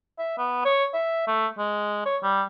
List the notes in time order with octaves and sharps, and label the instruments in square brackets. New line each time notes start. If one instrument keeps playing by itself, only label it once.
[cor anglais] E5
B3
C#5
E5
A3
G#3
C#5
G3